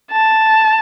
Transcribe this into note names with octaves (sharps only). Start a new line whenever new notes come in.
A5